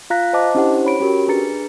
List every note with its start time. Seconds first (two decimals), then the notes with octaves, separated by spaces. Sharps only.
0.10 F4 F5 A#5 F#6 A#6 B6
0.33 C5 D#5 A5 D6
0.55 C#4 D4 E4 G4 C5 F#5
0.85 C#5 B5 D7
1.00 C#4 F#4 G4 A#4
1.28 D4 G#4 B4 A#5 A6 C#7